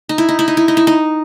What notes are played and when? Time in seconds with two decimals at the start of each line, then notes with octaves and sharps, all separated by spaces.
0.09 D#4
0.18 E4
0.29 D#4
0.39 E4
0.48 D#4
0.57 E4
0.68 D#4
0.77 E4
0.87 D#4